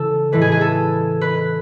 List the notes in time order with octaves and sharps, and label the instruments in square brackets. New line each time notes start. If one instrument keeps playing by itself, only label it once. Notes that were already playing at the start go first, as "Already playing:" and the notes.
Already playing: [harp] C#3 E3 A4
A2 E3 G#3 B4
G#4
G#4
A4
B4